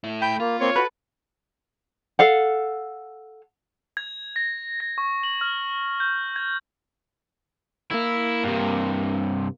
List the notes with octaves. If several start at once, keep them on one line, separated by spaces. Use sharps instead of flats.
A3 E4
G5 B5 G6
A#3 F4
A#3 C4 C#5 C6
F#4 A4 B4 B5
A4 F5 F#5
G#6
A#6
A#6
C#6
F#7
F6
G6
G#6
A#3 E4
G2 C3